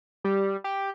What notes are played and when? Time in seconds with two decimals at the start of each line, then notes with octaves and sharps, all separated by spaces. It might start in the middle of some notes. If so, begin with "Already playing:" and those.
0.24 G3
0.64 G4